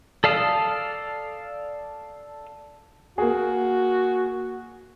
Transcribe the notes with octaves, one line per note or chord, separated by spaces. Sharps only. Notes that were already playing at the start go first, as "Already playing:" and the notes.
A4 D5 F5 A5 D#6
A#3 F#4 G#4